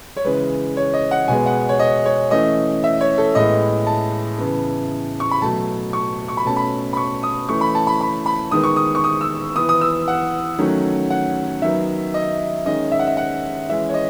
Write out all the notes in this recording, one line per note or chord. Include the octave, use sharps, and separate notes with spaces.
C#5
C#3 E3 G#3 B4
C#5
D#5
F#5
B2 G#3 B3 G#5
F#5
C#5
D#5
C#5
E3 A3 C#4 D#5
E5
C#5
A4
A2 G#3 B3 D#5
A5
C#3 E3 B3
C#6
B5
B2 F#3 A3 A5
C#6
C#6
B5
B2 A3 C#4 A5
B5
B5
C#6
D#6
E3 A3 C#4 C#6
B5
A5
B5
B5
B5
D#3 G#3 B3 D#6
C#6
D#6
C#6
D#6
E6
E3 B3 D#6
D#6
E6
F#5
D#3 F#3 A3 C#4
F#5
D#3 F#3 B3 E5
D#5
D#3 G#3 C#4 D#5
E5
F#5
E5
F#5
E3 G#3 C#4 E5
C#5
D#5